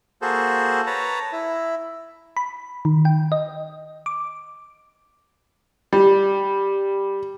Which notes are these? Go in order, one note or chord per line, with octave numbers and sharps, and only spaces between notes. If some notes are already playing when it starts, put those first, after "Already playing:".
A#3 F#4 G#4 A4 C5
B4 C#5 A5 A#5
E4
B5
D#3
G5
D#5
D6
G3